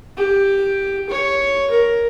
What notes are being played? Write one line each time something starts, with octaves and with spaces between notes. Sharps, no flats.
G4
C#5
A#4